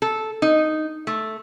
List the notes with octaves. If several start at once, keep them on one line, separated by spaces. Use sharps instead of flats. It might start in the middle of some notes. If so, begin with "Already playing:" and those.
A4
D#4
A3